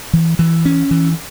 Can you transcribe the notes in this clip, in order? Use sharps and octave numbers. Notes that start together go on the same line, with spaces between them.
E3
E3
C#4
E3